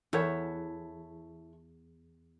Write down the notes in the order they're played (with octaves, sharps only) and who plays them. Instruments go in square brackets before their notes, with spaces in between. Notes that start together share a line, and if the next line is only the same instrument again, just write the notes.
[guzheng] E2 [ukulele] E4 A4 C#5